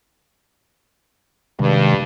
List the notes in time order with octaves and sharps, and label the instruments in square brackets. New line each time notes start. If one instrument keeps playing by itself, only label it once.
[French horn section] G2 [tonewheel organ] C3 D#3 G#3